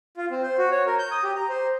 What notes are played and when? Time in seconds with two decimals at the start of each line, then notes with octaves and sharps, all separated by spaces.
0.17 F4
0.31 C4
0.43 C5
0.58 F#4
0.71 C#5
0.86 A#4
0.99 G6
1.11 D#6
1.23 G4
1.36 A#5
1.49 C5